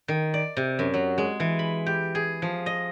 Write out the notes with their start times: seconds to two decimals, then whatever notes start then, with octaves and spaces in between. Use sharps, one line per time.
0.08 D#3
0.34 D5
0.57 C3
0.79 F#2
0.94 F#3
1.18 G#3
1.40 E3
1.59 B5
1.86 G4
2.15 G#4
2.42 F3
2.66 D#5